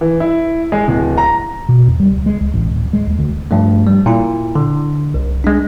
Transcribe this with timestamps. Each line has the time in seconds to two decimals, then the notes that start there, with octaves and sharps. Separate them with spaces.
0.01 E3
0.20 E4
0.72 G#3
0.88 D1
1.18 A#5
1.69 B2
1.87 E2
2.00 G3
2.11 C#2
2.26 G#3
2.41 C#2
2.54 A1
2.71 D1
2.93 G#3
3.07 D#2
3.19 D2
3.51 G2 F3 A3
3.87 G3
4.06 A#2 E4
4.55 D3
5.14 C2
5.44 G#3 D4